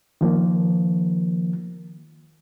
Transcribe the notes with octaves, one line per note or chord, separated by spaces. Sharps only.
D#3 F3 A#3